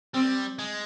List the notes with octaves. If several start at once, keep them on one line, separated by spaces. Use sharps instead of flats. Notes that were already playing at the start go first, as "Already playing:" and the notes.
G3 C4
G#3